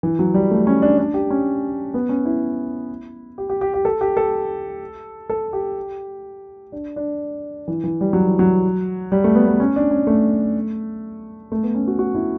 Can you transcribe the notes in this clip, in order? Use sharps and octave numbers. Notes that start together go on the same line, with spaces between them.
E3
F#3
G3
A3
C#4
D4
D4
G4
C#4
B3
C#4
E4
G4
G4
G4
G4
A4
G4
A4
A4
G4
D4
D4
E3
E3
G3
F#3
E3
F#3
G3
A3
B3
B3
C#4
D4
C#4
A3
A3
B3
C#4
F#4
F#4
E4